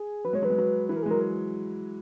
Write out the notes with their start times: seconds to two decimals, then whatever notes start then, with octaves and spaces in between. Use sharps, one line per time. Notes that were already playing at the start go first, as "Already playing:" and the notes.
Already playing: G#4
0.24 F#3 B4
0.33 G#3 C#5
0.42 F#3 B4
0.50 G#3
0.58 F#3
0.89 E3 B4
0.96 A#4
1.03 G#4
1.06 G#3
1.10 F#3 A#4